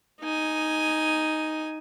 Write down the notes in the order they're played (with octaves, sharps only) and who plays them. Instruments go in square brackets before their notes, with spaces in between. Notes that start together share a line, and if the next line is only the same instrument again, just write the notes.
[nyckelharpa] D#4 G#5